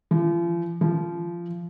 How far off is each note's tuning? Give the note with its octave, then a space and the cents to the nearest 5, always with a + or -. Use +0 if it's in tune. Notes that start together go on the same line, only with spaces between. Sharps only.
F3 -40
F3 -20